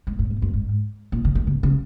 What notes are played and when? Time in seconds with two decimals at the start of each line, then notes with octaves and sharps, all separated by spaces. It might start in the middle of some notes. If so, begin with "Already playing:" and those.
0.07 G#2
0.19 G#2
0.30 A#2
0.42 F#2
0.54 G#2
1.12 A#2
1.25 C#3
1.35 D#3
1.47 C#3
1.63 C#3